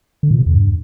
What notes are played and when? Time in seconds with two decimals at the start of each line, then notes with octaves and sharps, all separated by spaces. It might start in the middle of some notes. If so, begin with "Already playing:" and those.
0.23 D3
0.31 A#2
0.39 C3
0.46 E2
0.54 G2